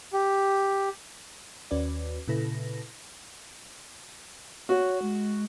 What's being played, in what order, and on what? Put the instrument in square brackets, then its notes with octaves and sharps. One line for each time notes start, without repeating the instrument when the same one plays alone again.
[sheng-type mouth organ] G4
[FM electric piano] D#2 C#4 F#4 B4 D5
A#2 C#3 E4 A4 B4 A#6
[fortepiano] F#4 [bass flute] C#5
[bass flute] G#3